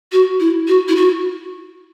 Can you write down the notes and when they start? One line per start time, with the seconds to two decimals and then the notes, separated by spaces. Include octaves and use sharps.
0.12 F#4
0.39 E4
0.67 F#4
0.88 E4
0.95 F#4